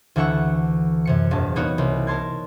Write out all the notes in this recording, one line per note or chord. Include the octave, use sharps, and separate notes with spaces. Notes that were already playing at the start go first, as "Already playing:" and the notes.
D2 E3 A4 E5 F#5 C#6
F#2 C3 C#7
E1 A#1 A5
G3 A#3 B3 D#4 F#4 C#5
C2
A#4 C#5 A5 C6 G#6